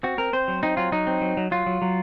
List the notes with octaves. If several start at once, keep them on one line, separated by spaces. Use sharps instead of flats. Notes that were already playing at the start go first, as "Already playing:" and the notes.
C4 F#4
C4 A#4
C4 C5
F#3
C4 D#4
F#3 F4
F#3 D#4
C4
F#3
F#3
F#3 F4
F#3
F#3